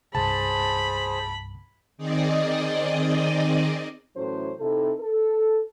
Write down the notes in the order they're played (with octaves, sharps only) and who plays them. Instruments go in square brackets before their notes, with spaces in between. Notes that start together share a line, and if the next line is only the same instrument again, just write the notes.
[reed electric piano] C2 G2 [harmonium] G#4 C5 [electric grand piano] A5 [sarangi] B5
[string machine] D#3 C4 D#4 G#4 D5 D#5
[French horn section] A2 E3 F#3 C#4 A4 C5
C3 C4 D#4 E4 A4
A4